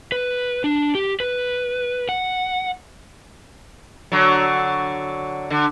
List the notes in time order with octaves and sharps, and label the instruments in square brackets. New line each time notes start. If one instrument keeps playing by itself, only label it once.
[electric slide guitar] B4
D4
G4
B4
F#5
[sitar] D3 F#3
D3